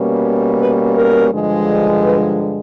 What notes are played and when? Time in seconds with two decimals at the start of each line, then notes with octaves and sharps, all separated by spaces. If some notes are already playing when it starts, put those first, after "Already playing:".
Already playing: B2 G3 A#3 C#4
0.59 B4
0.94 A#4
1.30 G2 D3 F3 G#3
2.02 B4